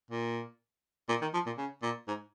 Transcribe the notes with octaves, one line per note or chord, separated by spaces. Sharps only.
A#2
A#2
D#3
F3
A#2
C#3
A#2
G#2